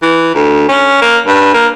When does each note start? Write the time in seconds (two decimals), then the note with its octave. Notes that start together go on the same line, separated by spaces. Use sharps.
0.02 E3
0.35 D2
0.69 C#4
1.02 A#3
1.27 G2
1.54 A#3